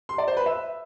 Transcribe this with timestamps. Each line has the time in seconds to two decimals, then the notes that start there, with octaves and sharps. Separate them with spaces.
0.09 C6
0.18 D5
0.28 C5
0.37 B4
0.46 E5